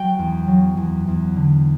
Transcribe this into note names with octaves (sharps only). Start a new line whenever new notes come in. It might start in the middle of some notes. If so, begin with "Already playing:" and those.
Already playing: F#3 G5
E2
F#3
E2
E2
D3